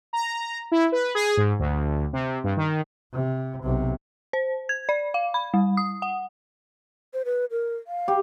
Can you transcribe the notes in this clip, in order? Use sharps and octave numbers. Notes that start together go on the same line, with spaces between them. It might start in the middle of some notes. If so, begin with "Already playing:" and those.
A#5
E4
B4
G#4
G#2
D2
C3
G2
D#3
C3
B1 C3
C5
G#6
D5
F5
B5
G3
D#6
F#5
C5
B4
A#4
F5
G4